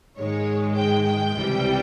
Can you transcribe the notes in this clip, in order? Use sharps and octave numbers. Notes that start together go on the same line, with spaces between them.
G#2 D#3 G#3 C#5
G5
G5
C#2 C3 E3 G3